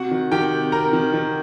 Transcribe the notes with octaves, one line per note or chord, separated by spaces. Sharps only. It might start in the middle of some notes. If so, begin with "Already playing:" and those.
Already playing: C3 F#4 F#5
D#3
D#3 G4 G5
C3
C3 A#4 A#5
D#3
D#3